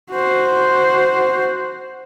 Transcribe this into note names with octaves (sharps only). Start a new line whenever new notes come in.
F#4 C5